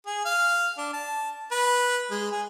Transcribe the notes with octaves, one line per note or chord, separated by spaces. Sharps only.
G#4
F5
D4
A5
B4
G#3
G#4